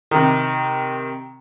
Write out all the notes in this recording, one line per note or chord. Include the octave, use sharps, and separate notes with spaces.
C3 D#3